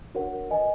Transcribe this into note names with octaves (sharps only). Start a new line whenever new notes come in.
D4 F#4 A#4 C#5 F#5
B4 D#5 G#5